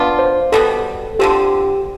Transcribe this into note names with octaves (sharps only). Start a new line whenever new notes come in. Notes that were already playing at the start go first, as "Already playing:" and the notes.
Already playing: B3 D4 F4
C5
B2 G3 B3 A4
D3 F3 C4 G4